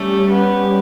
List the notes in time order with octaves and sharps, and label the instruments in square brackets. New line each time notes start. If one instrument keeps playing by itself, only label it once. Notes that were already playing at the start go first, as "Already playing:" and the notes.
Already playing: [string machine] G3 C#4 G4 [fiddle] A3
[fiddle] B3